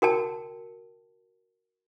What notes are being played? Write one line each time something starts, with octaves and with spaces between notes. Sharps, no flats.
F#4 A#4 G5 A5